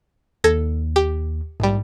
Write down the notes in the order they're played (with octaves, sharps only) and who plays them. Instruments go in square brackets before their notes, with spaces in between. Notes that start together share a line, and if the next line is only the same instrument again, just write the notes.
[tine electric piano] D#2 [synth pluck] A4 G#6 A#6
[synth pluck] G4
[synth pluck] A#1 G3 [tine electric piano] G#2